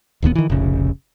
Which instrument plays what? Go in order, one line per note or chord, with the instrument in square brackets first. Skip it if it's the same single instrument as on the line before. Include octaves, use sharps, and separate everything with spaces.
[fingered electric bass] D1 D#2 C#3 B3
D#3 E3
F1 A#1 C#3